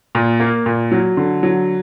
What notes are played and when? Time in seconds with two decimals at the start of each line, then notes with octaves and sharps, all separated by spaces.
0.15 A#2
0.40 A#3
0.66 A#2
0.91 F#3
1.17 D3
1.43 F#3